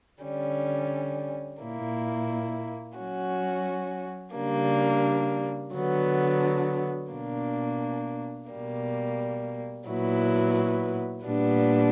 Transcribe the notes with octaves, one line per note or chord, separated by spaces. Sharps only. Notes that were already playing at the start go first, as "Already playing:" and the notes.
D3 G3 C#4
A#2 A#3 E4
F#3 C#4 F#4
C#3 G3 A#3 D4
D3 F#3 B3
B2 A#3 D4
B2 G3 A#3
A#2 F#3 B3 E4
A#2 G3 B3 D4